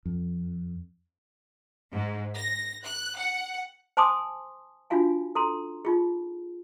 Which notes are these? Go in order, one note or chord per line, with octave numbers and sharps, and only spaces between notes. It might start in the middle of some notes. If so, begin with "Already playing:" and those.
F2
G#2
A#6
F#6
F#5
C5 G#5 A5 C6 D6 D#6
D4 D#4 F4 F#4 F5 G#5
A4 A#5 C6
D#4 F4 G#4